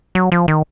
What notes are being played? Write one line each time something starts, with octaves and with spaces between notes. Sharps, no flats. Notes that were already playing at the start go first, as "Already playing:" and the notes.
F#3
F3
D#3